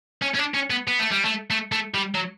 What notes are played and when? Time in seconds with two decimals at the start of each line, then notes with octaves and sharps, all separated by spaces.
0.22 C#4
0.35 C#4
0.39 D4
0.54 C#4
0.70 B3
0.88 B3
0.99 A3
1.12 G3
1.25 A3
1.51 A3
1.72 A3
1.95 G3
2.15 F#3